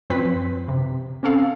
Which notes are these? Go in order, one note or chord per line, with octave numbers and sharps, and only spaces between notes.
F#2 F3 C4 B4 B6
C3
C4 C#4 A4 F5